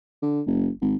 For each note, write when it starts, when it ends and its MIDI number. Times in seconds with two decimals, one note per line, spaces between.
0.22 0.41 50
0.46 0.69 30
0.81 0.95 32